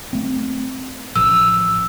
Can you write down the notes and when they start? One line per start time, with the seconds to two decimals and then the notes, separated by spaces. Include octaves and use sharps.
0.13 A3 C4
1.16 A1 F3 E6